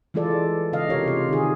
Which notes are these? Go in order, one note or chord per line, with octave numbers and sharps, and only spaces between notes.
E3 G#3 F4 A4 D5
C#3 D#5 F5
C3 F4 G4 A#4 C#5
C3 F4
D#3 G#4